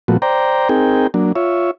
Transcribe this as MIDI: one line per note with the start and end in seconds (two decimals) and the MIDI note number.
0.08 0.17 46
0.08 0.17 53
0.08 0.17 57
0.08 0.17 59
0.08 0.17 66
0.22 0.69 72
0.22 0.69 74
0.22 0.69 79
0.22 0.69 82
0.69 1.07 60
0.69 1.07 63
0.69 1.07 68
0.69 1.07 70
0.69 1.07 79
1.14 1.32 54
1.14 1.32 58
1.14 1.32 62
1.35 1.71 65
1.35 1.71 73
1.35 1.71 76